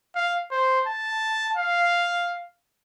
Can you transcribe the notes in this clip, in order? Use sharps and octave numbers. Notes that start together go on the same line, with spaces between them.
F5
C5
A5
F5